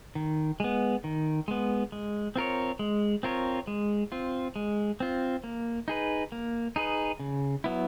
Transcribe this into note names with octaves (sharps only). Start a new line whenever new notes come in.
D#3
G#3 B3
D#3
G#3 B3
G#3
C4 F4 A#4 C#5
G#3
C4 F4 A#4 C#5
G#3
C4 F4
G#3
C4 F4
A#3
D#4 G#4 B4
A#3
D#4 G#4 B4
C#3
F#3 B3 E4